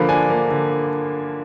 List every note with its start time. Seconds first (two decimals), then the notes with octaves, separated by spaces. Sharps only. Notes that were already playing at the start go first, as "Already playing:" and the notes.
Already playing: D3 F3 A#3 B5
0.09 D4 G#5
0.30 A#3
0.51 D3